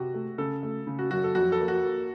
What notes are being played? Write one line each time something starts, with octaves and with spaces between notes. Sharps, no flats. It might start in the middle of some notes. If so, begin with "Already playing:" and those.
Already playing: C3 F#4
A3
C#3 A4
A3
C#3
F#4
F#2 F#4
A4
F2 F#4
A4
A#3
F#4
A#3